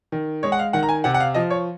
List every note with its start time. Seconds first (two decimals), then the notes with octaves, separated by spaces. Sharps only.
0.12 D#3
0.43 G#3 C#5
0.52 F#5
0.59 F5
0.73 D#3 F#5
0.83 A#5
0.89 G#5
1.04 C3 F#5
1.14 F#5
1.20 F5
1.34 F3 D#5
1.50 C#5